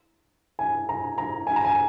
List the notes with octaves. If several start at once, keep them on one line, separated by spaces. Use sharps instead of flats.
G#5
A#5
A#5
G#5
A#5
G#5